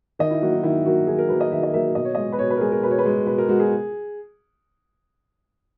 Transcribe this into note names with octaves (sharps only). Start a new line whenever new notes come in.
D#3 D#5
E4
F#3 A#3 F#4
D#4
D#3 E4
F#3 A#3 F#4
D#3 G#4
A#4
F#3 A#3 B4
D#5
D#3 E5
D#5
F#3 A#3 E5
B2 D#5
C#5
G#3 D#5
B4
B2 C#5
B4
A#4
G#3 G#4
A#4
B2 B4
C#5
B4
G#3
B2 B4
A#4
G#3 F#4
G#4